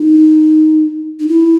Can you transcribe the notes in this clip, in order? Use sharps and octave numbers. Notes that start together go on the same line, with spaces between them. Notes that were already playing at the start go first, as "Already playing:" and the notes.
Already playing: D#4
D#4
E4